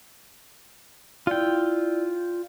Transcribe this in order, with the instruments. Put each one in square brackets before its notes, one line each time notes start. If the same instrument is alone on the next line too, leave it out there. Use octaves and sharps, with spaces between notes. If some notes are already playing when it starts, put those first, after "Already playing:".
[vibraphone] E4 D5 [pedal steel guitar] F4 G5